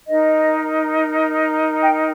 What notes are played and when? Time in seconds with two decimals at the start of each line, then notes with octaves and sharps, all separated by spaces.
0.07 D#4 A#4 D#5
1.82 G5